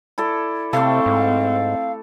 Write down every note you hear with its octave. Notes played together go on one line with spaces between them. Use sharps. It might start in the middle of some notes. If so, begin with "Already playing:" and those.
E4 A4 D5
C3 A3 C4 A4 F5
G#2